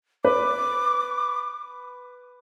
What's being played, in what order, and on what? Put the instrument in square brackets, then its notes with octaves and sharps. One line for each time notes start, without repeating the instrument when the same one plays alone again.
[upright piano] B4 [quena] D6